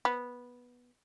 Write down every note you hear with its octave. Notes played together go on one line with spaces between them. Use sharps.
B3